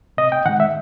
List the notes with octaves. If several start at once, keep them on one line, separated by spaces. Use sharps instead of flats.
C3 D#5
G5
D#3 G#3 F#5
E5